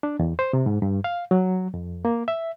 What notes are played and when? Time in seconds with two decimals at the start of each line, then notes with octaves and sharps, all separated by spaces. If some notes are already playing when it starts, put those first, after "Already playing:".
0.03 D4
0.19 E2
0.39 C5
0.53 C3
0.66 G#2
0.82 G2
1.04 F5
1.31 F#3
1.74 F2
2.05 A#3
2.28 E5